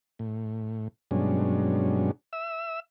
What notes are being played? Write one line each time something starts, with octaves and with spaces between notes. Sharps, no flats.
A2
G2 B2 F#3 G#3 C#4 D4
E5 E6